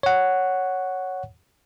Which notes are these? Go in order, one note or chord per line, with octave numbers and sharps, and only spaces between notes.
C#5 F#5